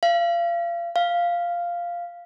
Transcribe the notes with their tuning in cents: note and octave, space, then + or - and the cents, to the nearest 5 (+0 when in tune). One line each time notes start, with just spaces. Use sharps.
F5 -30
F5 -5